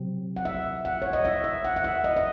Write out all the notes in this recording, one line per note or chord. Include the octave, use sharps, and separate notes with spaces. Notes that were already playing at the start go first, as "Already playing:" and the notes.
Already playing: C3 F#3 C4
F#5
E5
F#5
C#5
D#5
E5
E5
F#5
F#5
E5
D#5
D#5